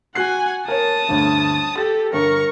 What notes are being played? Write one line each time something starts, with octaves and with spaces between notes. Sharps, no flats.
F#4 F#5 G#5 F#6 C7
A#4 C#5 A5 D#6
G1 D2
G4 A4 A6
G1 A#4 C#6